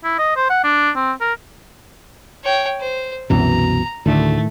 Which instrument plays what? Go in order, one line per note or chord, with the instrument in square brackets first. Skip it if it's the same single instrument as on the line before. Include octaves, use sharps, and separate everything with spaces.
[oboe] E4
D#5
C5
F#5
D4
C4
A#4
[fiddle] C#5 G5
C5
[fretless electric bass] C2 F#2 E3 [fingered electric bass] B2 [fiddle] A#5
[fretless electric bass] D2 D3 [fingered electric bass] A2 D#3 [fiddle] A3